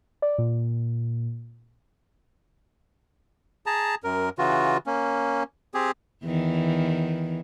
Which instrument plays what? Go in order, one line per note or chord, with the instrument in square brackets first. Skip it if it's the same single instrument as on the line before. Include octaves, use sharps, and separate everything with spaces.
[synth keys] D5
A#2
[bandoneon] G#4 A5 A#5
F#2 A#4
C#3 E3 F4 F#4
A#3 C#4
C4 G4 G#4
[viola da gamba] E2 D#3 E3